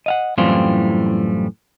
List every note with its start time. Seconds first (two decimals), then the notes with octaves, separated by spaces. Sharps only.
0.06 D#5 F5 F#5
0.38 F#2 A2 E3 G3 C4 F4